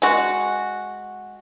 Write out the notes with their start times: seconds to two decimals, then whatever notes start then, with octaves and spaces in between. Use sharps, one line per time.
0.02 G#3 F#4